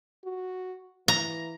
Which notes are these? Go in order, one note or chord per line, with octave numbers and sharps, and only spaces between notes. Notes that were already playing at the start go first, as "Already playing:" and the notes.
F#4
E3 A#5